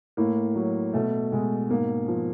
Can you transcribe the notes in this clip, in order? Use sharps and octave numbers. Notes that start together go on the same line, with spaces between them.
A2 A#3
F#3
B2 A3
B2 G#3
G#2 A#3
F3